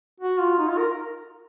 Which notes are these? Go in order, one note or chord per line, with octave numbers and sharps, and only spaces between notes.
F#4
F4
D#4
F4
A#4